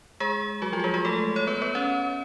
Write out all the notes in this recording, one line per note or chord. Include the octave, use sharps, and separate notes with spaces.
G#3 G#4
F#3 F#4
F3 F4
F#4
G#3 G#4
G#3 G#4
A3 A4
C#5
B3 B4
B3 B4
C#4 C#5